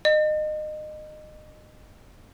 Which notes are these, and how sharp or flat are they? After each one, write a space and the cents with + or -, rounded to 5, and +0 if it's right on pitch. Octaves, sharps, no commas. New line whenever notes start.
D#5 -25